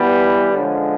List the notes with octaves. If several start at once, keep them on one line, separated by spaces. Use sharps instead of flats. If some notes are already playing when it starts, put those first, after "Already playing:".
Already playing: E3 G3 B3
D3 F3 G#3 C#4